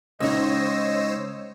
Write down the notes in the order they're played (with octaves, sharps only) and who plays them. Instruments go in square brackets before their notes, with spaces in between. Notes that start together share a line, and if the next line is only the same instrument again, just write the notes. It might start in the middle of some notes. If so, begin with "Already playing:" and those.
[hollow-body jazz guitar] C#2 [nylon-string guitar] C#4 D#4 [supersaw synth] C5 C#5 E6 [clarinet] D#5